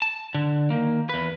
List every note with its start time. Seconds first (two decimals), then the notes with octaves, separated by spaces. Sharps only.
0.02 A5
0.34 D3
0.70 D#3 A#3
1.09 E2 B4